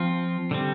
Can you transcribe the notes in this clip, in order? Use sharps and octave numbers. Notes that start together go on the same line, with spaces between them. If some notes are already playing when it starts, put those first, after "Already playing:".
Already playing: F3 C4 F4
D3 G3 C4